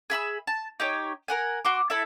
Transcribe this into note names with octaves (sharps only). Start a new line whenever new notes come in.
G#4 E5 B5 E6
A5
D#4 G4 C#5
A#4 F#5 G#5
F#4 C6 D6
E4 A4 E5 B5